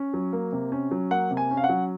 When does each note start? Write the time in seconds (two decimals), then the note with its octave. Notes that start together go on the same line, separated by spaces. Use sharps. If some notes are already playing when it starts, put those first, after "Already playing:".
Already playing: C#4
0.14 F#3
0.33 A#3
0.52 C3
0.72 C#4
0.91 F#3
1.11 A#3 F#5
1.31 C3
1.37 G#5
1.51 C#4
1.57 F5
1.64 F#5
1.69 F#3